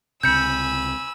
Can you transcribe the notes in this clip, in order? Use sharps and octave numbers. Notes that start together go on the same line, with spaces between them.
C#2 C3 G#5 B5 E6 G6 C#7